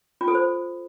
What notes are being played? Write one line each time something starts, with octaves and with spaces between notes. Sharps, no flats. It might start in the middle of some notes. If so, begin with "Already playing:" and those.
F4
A4
C5